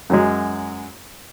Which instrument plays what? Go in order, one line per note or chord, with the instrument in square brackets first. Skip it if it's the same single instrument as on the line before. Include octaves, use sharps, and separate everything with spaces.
[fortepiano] F#2 F#3 G#3